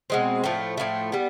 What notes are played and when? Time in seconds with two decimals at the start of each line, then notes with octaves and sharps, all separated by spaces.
0.10 B2 G#3 C4
0.44 A2 F3 A3
0.77 A2 F3 A3
1.12 G3 B3